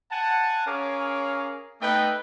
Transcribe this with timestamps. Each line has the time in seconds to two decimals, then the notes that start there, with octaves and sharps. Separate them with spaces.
0.12 F#5 G#5 A5
0.67 C#4 G#4 A#4 C#5 F5 D6
1.82 A3 B3 D#4 B4 D#5 G5